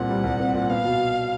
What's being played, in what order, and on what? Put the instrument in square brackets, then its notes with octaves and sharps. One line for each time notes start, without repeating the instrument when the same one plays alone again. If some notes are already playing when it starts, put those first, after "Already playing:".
Already playing: [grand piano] C2 A#2 C4 [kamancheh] F#5
[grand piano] G3
C2
C4
A#2
[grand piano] B3 [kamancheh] F5
[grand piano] B2